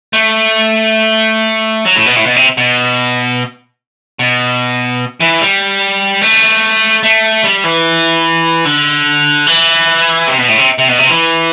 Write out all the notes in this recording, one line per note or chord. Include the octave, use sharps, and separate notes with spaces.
A3
F#3
A2
B2
A2
B2
C3
B2
B2
E3
G3
A3
A3
G3
E3
D3
E3
C3
B2
A2
C3
C3
B2
C3
E3